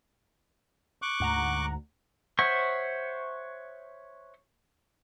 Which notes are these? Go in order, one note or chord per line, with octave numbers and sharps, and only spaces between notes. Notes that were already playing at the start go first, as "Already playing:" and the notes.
C#6 D6 F#6
D2 G#2 F#5 A#5
C5 C#5 E5 F#5 C#6